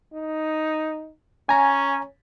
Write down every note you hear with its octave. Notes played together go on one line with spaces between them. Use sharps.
D#4
C#4 G#5 A#5